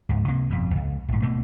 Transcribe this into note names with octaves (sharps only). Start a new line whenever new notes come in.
C#2 G#2
C#2 C3 A#3
G1 F2 B2
C#2
A#1 G#2
D1 B2 A3 A#3